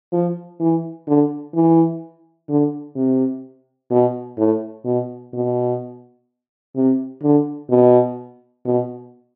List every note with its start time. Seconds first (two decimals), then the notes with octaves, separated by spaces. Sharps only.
0.13 F3
0.60 E3
1.07 D3
1.55 E3
2.50 D3
2.96 C3
3.91 B2
4.38 A2
4.85 B2
5.34 B2
6.76 C3
7.23 D3
7.71 B2
8.65 B2